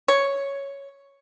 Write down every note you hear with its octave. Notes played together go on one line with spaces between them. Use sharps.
C#5